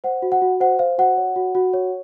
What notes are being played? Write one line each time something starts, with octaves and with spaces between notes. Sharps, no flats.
C5 F#5
F#4
F#5
F#4
C5 F#5
C5 F5
F#4 F#5
C#5
F#4
F#4
C#5